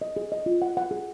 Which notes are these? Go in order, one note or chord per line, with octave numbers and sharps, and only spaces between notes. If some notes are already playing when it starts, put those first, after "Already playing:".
D#5
G#4
D#5
F4
F#5
F#5
G#4